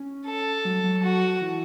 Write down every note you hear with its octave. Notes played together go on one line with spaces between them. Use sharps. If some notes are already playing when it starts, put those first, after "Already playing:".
Already playing: C#4
A4
F#3
F#3
F#4
E3